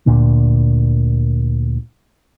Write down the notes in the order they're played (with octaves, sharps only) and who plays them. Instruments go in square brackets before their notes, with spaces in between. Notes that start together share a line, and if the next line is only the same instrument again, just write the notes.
[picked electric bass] D2 A#2 D3